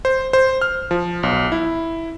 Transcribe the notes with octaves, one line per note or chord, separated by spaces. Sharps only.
C5
C5
F6
F3
B1
E4